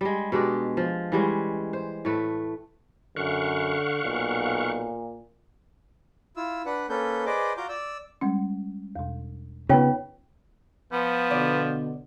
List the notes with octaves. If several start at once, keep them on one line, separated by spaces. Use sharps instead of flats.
G3 G#3
B2 G#3 D4 G4
F3
E3 G3 G#3 C#4
C5
A2 A3 B4
F#2 D3 F5 F#5 C#6
B1 A#2
E4 F4 E6
D4 B4 F#5
A#3 C#4 A4 B4 G6
G#4 B4 C5 D5 D#5 D6
F4 F#4 A#5 D6 G6
D5 E6
G3 G#3 C#4
E2 B2
C#3 B3 D#4 F4 C#5 G5
F3 B3
B2 D3 D5